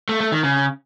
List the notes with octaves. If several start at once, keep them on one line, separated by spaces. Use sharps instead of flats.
A3
A3
D#3
C#3